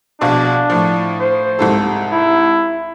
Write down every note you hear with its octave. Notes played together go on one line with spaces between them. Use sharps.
A#1 B2 D4 F5
A2 F3
C5
C2 G#2 A4
E4